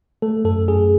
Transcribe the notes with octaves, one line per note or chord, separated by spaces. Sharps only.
A3 A4
F#2 A4
F#2 G#4